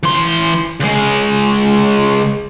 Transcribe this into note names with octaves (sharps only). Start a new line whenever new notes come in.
E3 C6
C#2 G#3